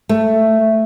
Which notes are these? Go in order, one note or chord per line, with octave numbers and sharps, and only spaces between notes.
A3